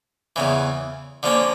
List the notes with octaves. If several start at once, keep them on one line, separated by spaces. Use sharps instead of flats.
E2 C#3 E3
D3 F3 A#3 C#4